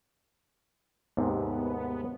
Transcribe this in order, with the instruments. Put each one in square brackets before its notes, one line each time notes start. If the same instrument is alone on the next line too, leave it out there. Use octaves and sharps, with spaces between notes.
[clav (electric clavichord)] D#2 G#2 C3 [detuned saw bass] B3